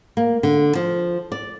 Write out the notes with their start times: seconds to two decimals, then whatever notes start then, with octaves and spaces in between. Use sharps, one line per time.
0.17 A#3
0.43 D3
0.75 F3
1.32 D5